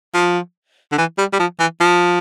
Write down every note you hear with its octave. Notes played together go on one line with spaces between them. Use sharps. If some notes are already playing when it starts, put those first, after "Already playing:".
F3
D3
E3
G3
G3
F3
E3
F3